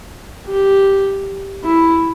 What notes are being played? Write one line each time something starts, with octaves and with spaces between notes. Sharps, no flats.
G4
E4